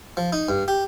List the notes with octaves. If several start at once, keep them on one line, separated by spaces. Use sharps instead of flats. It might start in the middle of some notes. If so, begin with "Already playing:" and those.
F3
D#4
G2
G4